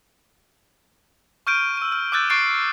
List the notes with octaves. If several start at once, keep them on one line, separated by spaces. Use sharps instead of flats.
C#6 F6 G6 D7 D#7
E6 D#7
F6
D6 E6 F#6 G6 A6
C#6 F#6 A6 C7 D7